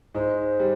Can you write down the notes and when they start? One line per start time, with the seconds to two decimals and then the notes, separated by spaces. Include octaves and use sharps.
0.14 G#2 G#3 C5
0.60 G3